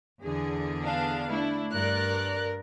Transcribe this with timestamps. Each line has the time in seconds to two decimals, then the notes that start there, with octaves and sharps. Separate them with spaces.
0.23 E2 D3 G#4
0.82 B3 D4 F5
1.30 A3 D4 E4
1.73 G2 A#4 D5 F#6